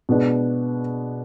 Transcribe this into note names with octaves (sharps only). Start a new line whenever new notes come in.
B2 G#3 B3 D4